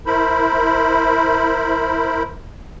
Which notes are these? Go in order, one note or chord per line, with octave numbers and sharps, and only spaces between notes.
E4 A#4 C5 B5